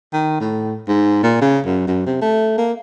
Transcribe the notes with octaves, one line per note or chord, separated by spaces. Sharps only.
D#3
A2
G#2
A#2
C#3
F#2
F#2
C3
A3
A#3